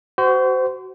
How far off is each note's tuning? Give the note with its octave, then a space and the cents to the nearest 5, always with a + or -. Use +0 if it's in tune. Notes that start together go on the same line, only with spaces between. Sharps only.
F#4 +25 C5 -25